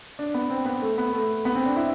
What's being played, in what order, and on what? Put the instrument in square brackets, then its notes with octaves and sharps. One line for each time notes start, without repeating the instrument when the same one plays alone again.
[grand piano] D4
B3
C4
B3
A3
B3
A3
B3
C4
D4
E4